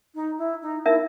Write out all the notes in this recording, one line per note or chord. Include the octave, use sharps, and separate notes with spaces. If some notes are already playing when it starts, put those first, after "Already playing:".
D#4
E4
D#4
D#4 E4 A#4 E5